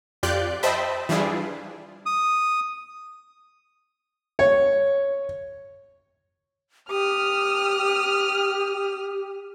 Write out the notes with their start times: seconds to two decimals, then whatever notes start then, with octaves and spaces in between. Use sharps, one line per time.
0.23 F2 F4 G4 D5 F#6 G6
0.63 C5 D#5 E5 G5 A5 B5
1.09 E3 G3 D4 E4 F4 G#4
2.06 D#6
4.39 C#5
6.90 G4 D#6 F6